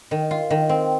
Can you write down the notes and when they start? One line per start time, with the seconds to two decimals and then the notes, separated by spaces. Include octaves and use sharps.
0.11 D#3
0.31 F4
0.50 D#3
0.69 C4